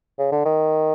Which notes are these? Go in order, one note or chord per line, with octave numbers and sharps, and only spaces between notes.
C#3
D3
D#3